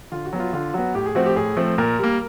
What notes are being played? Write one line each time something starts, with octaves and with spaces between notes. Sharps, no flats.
D3 F4
F#4
F#3 B3
F4
D3 F4
F#3 B3 F#4
A2 G4
G#4
F3 A3 C4 F#4
G4
A2 G#4
F3 A3 C4
A#2 A#4
G3 A#3